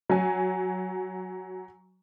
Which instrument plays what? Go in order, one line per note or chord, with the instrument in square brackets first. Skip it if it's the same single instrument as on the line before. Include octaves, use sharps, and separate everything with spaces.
[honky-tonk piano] F#3 G#5